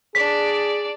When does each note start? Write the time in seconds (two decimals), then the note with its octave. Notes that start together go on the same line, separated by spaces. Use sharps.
0.15 D4 G#4 D5 B6